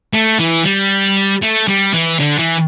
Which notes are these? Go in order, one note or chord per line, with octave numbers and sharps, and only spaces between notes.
A3
E3
G3
A3
G3
E3
D3
E3